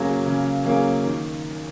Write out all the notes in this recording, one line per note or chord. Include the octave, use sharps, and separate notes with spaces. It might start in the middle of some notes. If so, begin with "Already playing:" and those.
Already playing: C#3 F#3 A#3 C#4 G#4
C#3
F#3 A#3 C#4 G#4
D#3